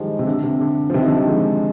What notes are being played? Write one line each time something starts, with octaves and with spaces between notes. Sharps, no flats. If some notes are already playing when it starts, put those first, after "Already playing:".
Already playing: D#3 F3 G3 G#3
C3
D3
C3
D3
F3
C3 D#3
D3 F3
D#3 G3
F3 G#3